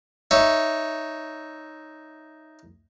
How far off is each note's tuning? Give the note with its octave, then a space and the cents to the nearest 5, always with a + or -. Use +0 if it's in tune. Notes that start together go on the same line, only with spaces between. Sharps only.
D#4 +0 C#5 +0 E5 +0